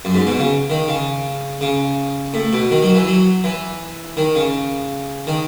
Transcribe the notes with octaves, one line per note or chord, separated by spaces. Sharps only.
F#2
G#2
B2
C#3
D#3
C#3
C#3
A2
B2
D#3
F#3
E3
F#3
E3
D#3
C#3
D#3